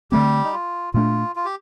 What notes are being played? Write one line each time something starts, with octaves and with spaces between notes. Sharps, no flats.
D3 G3 A3 C4 G4
D#4
F4
A#2 A3 D4 F4
F4
G4